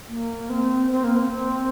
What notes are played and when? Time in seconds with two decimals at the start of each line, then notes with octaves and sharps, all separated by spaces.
0.07 A#3
0.50 C4
0.92 C4
1.04 A#3
1.16 C4